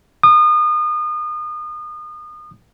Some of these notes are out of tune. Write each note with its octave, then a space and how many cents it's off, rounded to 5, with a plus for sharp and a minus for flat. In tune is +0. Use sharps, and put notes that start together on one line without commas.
D#6 -35